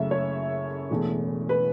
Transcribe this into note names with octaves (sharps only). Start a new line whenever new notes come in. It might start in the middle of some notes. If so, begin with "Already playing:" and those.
Already playing: F#1 F#2 C#3 A3 E5
C#5
E1 E2 E3 A3
B4